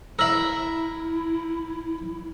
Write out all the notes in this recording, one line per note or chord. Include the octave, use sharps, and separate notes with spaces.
E4 A#4 E5 E6 F#7